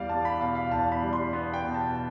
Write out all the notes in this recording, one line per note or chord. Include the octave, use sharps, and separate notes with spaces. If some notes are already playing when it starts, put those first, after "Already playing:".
Already playing: E2 G3 D5 F5
B3 A5
B5
B2 F5
F5
E2 A5
B5
G3
C6
B3
G5
B2
A5